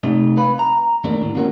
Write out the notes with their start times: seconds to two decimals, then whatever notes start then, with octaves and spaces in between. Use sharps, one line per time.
0.03 C3 A3 D#4 D#5
0.37 B4 F5 B5
0.59 A#5
1.04 D#2 A3 A#3 D4
1.21 A2 D3
1.35 A#3 C#4 F#4 A#4